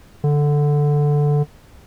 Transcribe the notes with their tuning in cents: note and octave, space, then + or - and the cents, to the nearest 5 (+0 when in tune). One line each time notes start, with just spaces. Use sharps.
D3 +0